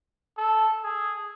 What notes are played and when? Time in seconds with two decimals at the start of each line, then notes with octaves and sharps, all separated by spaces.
0.38 A4
0.83 G#4